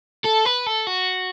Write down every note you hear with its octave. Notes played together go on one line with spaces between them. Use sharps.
A4
B4
A4
F#4